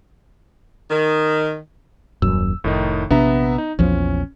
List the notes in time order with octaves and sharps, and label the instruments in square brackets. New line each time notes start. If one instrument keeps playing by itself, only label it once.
[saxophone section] D#3
[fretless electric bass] D#1 F#2 [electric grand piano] E6
[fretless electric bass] F1 [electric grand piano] A2 D#3 D#4
[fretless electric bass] A#1 C3 D4 [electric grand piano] B3 E5 A#5
[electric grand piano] D#4
[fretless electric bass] A#1 E2 F3 [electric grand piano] C#4